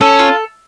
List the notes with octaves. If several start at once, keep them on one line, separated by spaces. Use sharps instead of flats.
C#4 A4
F4